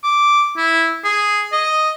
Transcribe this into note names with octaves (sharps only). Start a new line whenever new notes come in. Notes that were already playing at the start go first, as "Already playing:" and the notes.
D6
E4
G#4
D#5